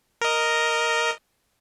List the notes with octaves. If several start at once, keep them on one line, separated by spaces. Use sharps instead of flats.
A#4 D#5